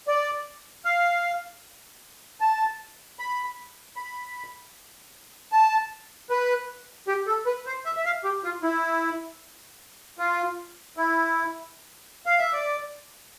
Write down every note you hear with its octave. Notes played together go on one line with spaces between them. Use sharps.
D5
F5
A5
B5
B5
A5
B4
G4
A4
B4
C5
E5
E5
F5
G4
F4
E4
F4
E4
F5
E5
D5